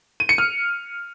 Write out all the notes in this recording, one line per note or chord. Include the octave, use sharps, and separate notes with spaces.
D#7
C#7
F6